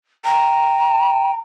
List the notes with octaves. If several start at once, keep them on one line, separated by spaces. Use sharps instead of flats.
G5 A#5